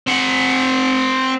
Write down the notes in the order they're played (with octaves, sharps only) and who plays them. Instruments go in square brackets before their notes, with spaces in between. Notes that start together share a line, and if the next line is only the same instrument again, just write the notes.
[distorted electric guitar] C4 F#5